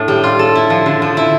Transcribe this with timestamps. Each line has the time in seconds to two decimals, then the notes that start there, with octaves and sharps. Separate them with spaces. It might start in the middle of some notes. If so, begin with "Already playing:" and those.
Already playing: A2 D4
0.08 G3
0.24 F4
0.39 A4
0.55 E4
0.70 F3
0.86 D3
1.02 F3
1.17 E4